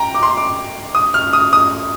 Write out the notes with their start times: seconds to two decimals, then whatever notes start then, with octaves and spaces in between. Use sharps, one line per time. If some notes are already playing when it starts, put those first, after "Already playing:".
Already playing: G5 A#5
0.14 D6
0.23 C6
0.37 D6
0.95 D#6
1.14 F6
1.33 D#6
1.53 D#6